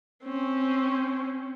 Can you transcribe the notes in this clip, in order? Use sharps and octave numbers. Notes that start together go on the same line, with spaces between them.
C4 C#4